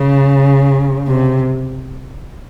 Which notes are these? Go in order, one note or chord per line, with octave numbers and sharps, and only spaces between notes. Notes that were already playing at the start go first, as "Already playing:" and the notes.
Already playing: C#3
C3